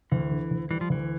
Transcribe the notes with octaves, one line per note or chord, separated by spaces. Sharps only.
D2 E3
D3
D2
E3 G3
F3
D2 E3